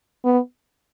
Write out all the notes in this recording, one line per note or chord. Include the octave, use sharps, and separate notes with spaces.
B3